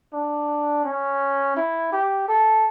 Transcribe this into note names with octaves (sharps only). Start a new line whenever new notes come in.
D4
C#4
E4
G4
A4